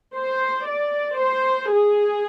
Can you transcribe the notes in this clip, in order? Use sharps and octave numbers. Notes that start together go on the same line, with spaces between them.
C5
D5
C5
G#4